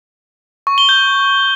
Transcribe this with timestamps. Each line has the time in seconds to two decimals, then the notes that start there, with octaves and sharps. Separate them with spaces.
0.67 C#6
0.78 G7
0.89 G6